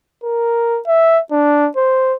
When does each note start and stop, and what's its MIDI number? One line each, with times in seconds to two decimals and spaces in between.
0.24 0.80 70
0.87 1.20 76
1.31 1.69 62
1.76 2.15 72